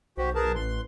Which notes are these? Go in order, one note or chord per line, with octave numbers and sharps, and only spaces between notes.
B1 F#4 G4 C5
G#4 A#4 B4 A5
A1 C6